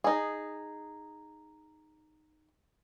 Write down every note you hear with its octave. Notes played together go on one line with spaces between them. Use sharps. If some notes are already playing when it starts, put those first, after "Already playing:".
D#4 G#4